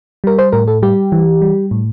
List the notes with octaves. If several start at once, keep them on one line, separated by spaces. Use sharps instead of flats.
G3 A#4
C5
A2 A#4
A4
G3 G4
E3
G3
A2